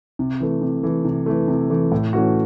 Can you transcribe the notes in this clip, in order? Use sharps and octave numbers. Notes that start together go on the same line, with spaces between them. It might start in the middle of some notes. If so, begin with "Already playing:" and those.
C3
E3 A3
C3
E3 A3
C3
E3 A3
C3
E3 A3
A2
E3 A3 C#4 F#4